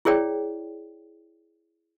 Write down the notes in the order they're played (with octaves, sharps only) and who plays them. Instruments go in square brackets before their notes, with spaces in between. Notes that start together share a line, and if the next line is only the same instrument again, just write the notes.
[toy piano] E4 G#4 C#5 D5 G5